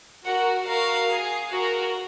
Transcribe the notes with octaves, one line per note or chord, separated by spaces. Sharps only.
F#4 A#4 F#5
F#4 A#4 F5
G#4
F#4 A#4